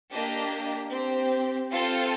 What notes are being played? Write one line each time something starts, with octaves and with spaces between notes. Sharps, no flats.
A#3 D4 G4 D#5
C4 G4
C4 F4 A4 F5